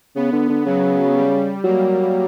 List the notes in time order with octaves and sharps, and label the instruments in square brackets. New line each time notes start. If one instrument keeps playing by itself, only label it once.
[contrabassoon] C#3 [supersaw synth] B3
[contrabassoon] D3
D3
[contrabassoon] C#3 [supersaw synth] F#3
[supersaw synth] G3
[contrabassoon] F#3 [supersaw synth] A#3